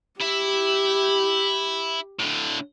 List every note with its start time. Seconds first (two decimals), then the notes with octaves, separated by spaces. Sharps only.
0.20 E4 G4 E5
2.19 A2 D3